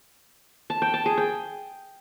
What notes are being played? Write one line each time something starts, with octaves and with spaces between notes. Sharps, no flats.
A5
G5
A5
G#4
G5